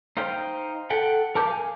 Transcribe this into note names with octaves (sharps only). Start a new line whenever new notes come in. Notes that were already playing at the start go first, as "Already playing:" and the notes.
D#4 C5 F5 G5
A4 F#5 G5
A#4 A5 D6 G6
F5 G#5